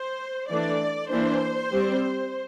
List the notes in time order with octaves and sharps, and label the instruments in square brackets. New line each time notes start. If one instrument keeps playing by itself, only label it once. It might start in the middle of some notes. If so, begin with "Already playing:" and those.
Already playing: [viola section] C5
E3 A3 D4 D5
E3 A#3 D4 C5
G3 C4